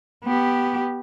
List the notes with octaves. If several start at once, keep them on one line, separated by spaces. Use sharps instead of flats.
B3 G4